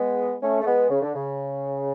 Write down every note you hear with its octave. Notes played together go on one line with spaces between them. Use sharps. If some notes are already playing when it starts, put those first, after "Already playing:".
Already playing: G#3 B3
A3 C#4
A3
G#3 B3
C#3
D3
C#3